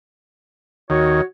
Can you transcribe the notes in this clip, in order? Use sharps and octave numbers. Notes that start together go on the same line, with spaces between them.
D#2 D#3 F#4 C#5